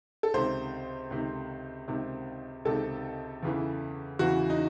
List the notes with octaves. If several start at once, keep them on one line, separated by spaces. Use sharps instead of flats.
A4
C#2 C3 D#3 C5
C#2 C3 D#3
C#2 C3 D#3
C#2 C3 D#3 A4
E2 C#3 E3
E2 C#3 E3 F#4
D#4